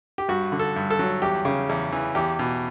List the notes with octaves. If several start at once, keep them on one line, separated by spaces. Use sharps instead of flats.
G4
G2 F#4
D3
A4
G2
A4
F#3
E2 G4
C#3
E2
E3
E2 G4
B2